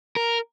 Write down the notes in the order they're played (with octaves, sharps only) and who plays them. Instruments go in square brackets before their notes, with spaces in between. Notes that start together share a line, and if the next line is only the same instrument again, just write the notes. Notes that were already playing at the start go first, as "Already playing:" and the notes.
[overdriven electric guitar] A#4